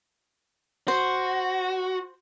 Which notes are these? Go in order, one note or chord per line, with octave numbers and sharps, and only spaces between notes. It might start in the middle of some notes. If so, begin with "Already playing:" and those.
F#4 C5